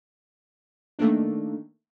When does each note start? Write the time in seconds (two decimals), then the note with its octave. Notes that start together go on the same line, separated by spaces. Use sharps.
0.99 D#3 A3 A#3 D4